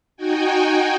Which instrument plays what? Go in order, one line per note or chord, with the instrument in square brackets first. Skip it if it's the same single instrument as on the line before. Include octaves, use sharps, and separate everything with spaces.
[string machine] D#4 F#4 G5 G#5